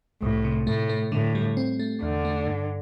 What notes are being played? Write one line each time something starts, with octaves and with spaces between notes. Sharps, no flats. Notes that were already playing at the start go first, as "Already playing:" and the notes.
C2 A2
C3
A2 A3
A3
A2 D3
G3
C4
A3
E2 D3
A3
G2